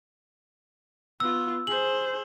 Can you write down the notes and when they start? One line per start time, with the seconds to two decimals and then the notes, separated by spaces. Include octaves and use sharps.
1.20 B3 F4 E6
1.67 G#4 C5 F#7